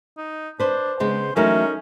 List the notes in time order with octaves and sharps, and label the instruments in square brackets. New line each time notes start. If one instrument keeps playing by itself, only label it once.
[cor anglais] D#4
[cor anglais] D4 [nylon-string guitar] B4 C5
[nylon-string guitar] C#3 G#3 B3 [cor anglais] C5
[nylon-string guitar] E3 F#3 A3 [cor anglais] C#4 [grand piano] D#4 A#4 A#5